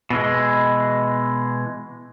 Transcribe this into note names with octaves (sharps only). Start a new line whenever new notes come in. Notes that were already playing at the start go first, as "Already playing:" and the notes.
B2 E3 G#3